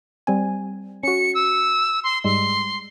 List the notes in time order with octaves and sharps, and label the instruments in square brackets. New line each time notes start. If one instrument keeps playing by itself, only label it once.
[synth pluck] G3 C4 G#5
[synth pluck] C#4 F#4 [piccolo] C#7
[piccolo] E6
C6
[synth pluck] G#2 G3 G#3 [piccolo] C6